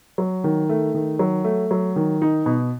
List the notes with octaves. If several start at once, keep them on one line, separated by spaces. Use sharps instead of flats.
F#3
D#3
A3
D#3
F#3
A3
F#3
D#3
D#4
B2